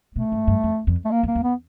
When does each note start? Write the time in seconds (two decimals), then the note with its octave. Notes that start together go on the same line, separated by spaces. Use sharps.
0.16 B2 A3
0.32 G#2
0.47 G2
0.64 F2
0.87 F2
1.05 A3
1.11 A#3
1.23 F2
1.28 A#3
1.35 E2
1.43 B3